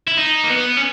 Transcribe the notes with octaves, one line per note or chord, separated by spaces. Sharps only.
E4
D#4
A#3
B3
C#4